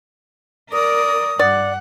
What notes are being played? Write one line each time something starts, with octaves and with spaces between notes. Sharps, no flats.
A#4 D5 D#6
G2 D5 F#5